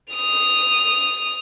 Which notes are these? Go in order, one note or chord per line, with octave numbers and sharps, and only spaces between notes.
D#6 F7